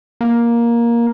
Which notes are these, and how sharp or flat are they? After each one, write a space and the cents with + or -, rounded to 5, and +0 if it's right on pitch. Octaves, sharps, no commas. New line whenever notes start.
A#3 +10